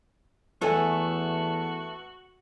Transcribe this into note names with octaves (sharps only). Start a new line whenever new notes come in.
E2 A3 B3 F#4 A4 G#5